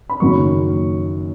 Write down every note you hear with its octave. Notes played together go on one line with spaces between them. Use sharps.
B5
F#1 F#2 D#3 F#3 A#3 C#6